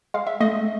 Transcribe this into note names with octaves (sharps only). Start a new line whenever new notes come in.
G#3 F5
E5
A3 D#5